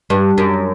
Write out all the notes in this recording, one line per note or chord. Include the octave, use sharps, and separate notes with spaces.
G2
F#2